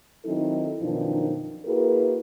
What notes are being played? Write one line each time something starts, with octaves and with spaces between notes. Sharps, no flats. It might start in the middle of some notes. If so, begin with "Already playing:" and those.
D#3 F#3 C4 D#4 E4 A4
F#2 B2 D#3 F3 D4 D#4
A#3 E4 F#4 G#4 A#4 B4